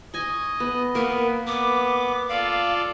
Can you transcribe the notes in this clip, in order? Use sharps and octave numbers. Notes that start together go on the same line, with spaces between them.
D#5 G#5 C#6
B3
A#3 B3 A#4
B3 D6
F4 A4 D5 F5